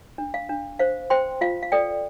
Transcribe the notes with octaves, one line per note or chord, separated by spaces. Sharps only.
D4
F5
D4
C5 F5
C5 G5 C6
F4 F5
F5
A4 D5 G5